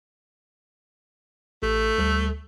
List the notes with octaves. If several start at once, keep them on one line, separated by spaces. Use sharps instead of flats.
A1 A3
D2 G3 A4